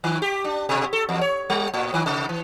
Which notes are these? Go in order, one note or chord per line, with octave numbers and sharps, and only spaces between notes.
D#3
G4
D4
B2
A4
E2
C#5
G3
A2
D#3
C3
E3